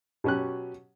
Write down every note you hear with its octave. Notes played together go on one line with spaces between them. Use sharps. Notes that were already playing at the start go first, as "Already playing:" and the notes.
B2 F#3 C#4 G4 F#6